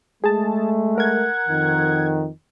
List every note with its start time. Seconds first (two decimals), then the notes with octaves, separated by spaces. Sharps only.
0.24 G#3 A3 G#4 A5
0.98 A#4 F#5 G#6
1.47 F2 D#3